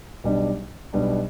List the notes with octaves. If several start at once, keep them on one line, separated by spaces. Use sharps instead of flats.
B1 B2 G3 D4
B1 B2 G3 D4